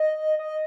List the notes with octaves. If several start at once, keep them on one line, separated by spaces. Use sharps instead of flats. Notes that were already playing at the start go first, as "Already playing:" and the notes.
Already playing: D#5
D#5